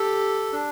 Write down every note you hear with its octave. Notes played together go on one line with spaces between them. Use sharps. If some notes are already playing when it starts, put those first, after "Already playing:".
Already playing: G4 A4
D4